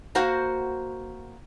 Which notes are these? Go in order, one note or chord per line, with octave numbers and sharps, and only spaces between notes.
A#3 F#4 C5 F#5